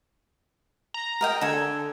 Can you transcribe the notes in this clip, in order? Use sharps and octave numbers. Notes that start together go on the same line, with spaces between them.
A#5
A#4 D#5 G5
D3 A4 G#5